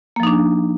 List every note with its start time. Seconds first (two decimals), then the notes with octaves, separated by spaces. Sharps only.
0.16 A#3
0.20 F3
0.23 D#4
0.27 D4